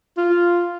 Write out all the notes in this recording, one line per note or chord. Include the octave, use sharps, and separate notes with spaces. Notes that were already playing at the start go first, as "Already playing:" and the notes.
F4